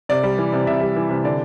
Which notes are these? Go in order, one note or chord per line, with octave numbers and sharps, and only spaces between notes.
C3 D5
G3
E3
C3
C3 E5
G3
E3
C3
D3 D5